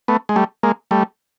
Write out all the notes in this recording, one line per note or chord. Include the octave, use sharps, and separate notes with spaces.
A3 B3
G#3
G3 A3
G#3 A#3
G3 A3